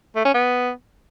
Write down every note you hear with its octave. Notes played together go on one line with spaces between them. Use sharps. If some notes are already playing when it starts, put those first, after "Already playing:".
A3
C#4
B3